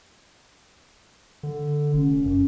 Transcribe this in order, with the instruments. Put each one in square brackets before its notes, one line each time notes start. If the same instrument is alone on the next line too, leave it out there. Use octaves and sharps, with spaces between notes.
[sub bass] D3
[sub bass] F1 [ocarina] C#4
[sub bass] F#2